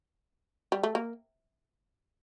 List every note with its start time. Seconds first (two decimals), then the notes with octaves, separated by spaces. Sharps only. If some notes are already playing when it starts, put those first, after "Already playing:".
0.72 G3
0.83 A3
0.95 A#3